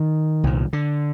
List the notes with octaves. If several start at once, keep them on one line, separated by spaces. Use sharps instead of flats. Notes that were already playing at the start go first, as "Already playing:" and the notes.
Already playing: D#3
C2 A#2
D3